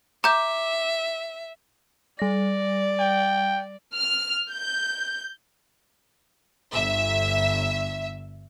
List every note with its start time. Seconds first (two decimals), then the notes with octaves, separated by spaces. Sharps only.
0.24 E5 A#5 D6 G6
2.19 G3 D5 A#6
3.00 G5
3.93 F6
4.50 G6
6.72 G1 E5